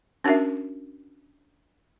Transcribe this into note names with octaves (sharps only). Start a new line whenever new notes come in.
C#4 D4 F#4 A#4 E5